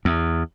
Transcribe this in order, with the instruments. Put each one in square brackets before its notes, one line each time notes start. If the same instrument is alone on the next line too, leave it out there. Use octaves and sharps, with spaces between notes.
[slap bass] E2